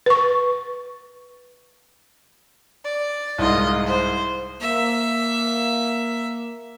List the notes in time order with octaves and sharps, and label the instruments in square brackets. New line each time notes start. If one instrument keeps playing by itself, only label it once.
[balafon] B4 C#6
[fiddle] D5
[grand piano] C2 G#2 [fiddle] F4 D#5
[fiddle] C5
[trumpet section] A#3 [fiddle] E5